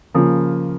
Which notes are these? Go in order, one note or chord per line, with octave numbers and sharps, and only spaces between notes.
C#3 F3 A#3